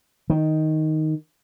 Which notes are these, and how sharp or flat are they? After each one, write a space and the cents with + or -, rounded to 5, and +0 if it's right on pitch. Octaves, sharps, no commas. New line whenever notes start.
D#3 +5